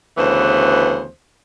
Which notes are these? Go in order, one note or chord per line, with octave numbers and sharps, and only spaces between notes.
D2 C#3 E3 B3 C5